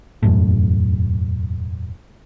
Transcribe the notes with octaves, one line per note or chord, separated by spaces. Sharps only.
E1 F#2 A2